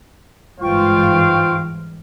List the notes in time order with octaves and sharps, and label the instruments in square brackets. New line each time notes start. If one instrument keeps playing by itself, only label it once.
[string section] G1 G#2 E3 [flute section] F4 G5 C#6 [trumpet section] C5 F5